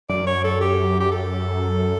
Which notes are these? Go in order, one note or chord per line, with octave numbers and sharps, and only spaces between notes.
F#2 D5
C#5
A4
G4
G4
A4